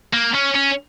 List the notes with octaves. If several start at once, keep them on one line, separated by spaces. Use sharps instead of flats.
A#3
C#4
C#4